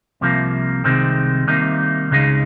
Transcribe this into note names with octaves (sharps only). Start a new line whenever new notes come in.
C2 C3 F3 A#3
C2 C3 D#3 G#3 C4
C2 C3 D#3 A#3 D#4
C#2 C#3 G#3 D#4